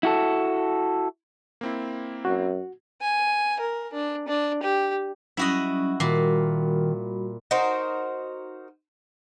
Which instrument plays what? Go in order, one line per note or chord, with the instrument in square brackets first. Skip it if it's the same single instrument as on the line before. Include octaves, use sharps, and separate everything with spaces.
[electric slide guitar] E4 F#4 A4
[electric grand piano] A#3 C4 E4
[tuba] F#2 [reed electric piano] F#4
[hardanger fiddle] G#5
A#4
D4
D4
G4
[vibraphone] F#3 G3 C#4 [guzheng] E4 F#4 D#5
[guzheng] A#2 [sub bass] D#3 [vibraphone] G3 F#4 B5
[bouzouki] D#4 F#4 A#4 C5